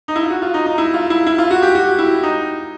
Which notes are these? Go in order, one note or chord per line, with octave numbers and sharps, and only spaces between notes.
D#4
E4
F4
F#4
F4
D#4
D#4
E4
F4
E4
E4
F4
F#4
G4
F#4
E4
D#4